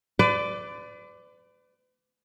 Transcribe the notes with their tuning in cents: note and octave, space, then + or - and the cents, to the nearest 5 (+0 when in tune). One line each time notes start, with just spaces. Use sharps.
B4 +40 D5 +0